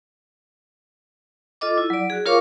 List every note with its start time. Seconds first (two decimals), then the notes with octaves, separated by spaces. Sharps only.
1.61 F4 A4 D#5 D6
1.78 E4
1.90 F#3 D5
2.10 F#4 G#4
2.26 F4 A#4 C#5 F5 C#6 D6